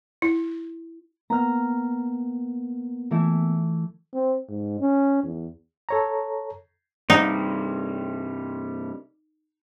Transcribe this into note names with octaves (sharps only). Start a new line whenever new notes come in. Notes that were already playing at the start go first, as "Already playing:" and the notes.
E4
A#3 B3 A#5 F6
E3 A3 E4
C4
G#2
C#4
E2
A4 C#5 A#5
G2 C3 G3 D#4